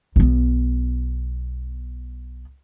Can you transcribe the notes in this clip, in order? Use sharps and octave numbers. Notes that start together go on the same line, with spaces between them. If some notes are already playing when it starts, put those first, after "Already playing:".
B1 B3